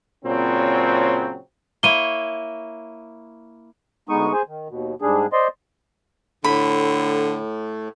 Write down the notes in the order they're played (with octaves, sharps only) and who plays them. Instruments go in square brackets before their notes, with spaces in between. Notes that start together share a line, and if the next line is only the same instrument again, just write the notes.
[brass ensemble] A#2 C#3 F#3 C4
[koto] A#3 E4 C#5 [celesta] D#7 G7
[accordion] D2 G#3 B3 D#4 C#6 D#6
G#4 C5 G#5
D#3
D#2 B2
G#2 G3 D4 G#4
C5 D5 D#5 C6
[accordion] A2 [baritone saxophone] D3 [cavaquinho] B5